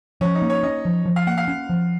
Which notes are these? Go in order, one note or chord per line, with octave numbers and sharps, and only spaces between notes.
F3 C#4
D#4
A#3
C#5
C#4 D#5
F3
F3
F5
A#3 F#5
F5
C#4
F3